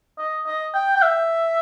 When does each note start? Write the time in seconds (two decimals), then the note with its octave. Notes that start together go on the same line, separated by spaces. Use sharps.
0.18 D#5
0.47 D#5
0.74 G5
0.96 G5
1.02 E5